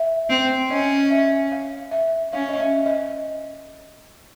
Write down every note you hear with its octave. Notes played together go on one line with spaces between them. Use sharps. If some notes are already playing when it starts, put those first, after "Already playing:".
Already playing: E5
C4
C#4 D#5
E5
F5
E5
C#4 F5
D#5
E5
D#5